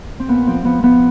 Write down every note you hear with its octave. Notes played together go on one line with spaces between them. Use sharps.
C4
A#2 B3
F3 C4
F3 B3
F3 B3